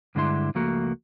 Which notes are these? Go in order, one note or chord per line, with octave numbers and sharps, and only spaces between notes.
G2 D3 G#3 D4 E4 C6
C#2 F3 A3 A#3 F#4